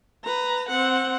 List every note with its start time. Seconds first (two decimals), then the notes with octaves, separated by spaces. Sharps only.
0.24 B4 A#5
0.69 C4 F#5